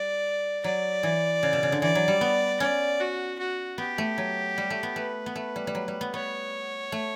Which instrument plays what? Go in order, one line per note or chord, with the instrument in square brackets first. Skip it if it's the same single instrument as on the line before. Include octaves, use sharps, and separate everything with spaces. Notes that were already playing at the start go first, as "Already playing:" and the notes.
Already playing: [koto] G3 [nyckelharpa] D5
[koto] F#3 [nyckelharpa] D5
[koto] E3
C#3
B2
C#3
D3
[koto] E3 [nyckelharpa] D5
[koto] F#3
G3
B3
[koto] C#4 [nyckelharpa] D5
[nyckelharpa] F#4
F#4
[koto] B3 [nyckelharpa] G4
[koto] A3
F#3
G3
A3
B3
[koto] A3 [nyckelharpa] B4
[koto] B3
A3
G3
G3
F#3
G3
B3
[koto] B3 [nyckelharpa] C#5
[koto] A3